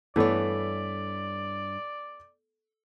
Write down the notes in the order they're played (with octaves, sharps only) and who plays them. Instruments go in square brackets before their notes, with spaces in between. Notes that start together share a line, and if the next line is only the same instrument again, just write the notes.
[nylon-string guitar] G2 C#5 [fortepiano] E3 A3 B3 [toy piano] A4 D6 [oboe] D5